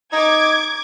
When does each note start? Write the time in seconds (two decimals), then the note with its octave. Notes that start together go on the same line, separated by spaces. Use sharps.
0.13 D#4 D6 G#6